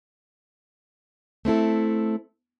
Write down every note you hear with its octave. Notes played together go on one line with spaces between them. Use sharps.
A3 C4 E4 A4